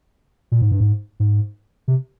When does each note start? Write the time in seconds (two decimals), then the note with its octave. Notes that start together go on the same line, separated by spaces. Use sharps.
0.52 A#2
0.62 G#2
0.71 G2
0.80 G#2
1.20 G#2
1.88 C3